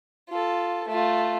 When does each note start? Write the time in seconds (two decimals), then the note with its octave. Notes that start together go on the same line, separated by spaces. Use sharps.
0.29 F4 A4
0.88 A3 F4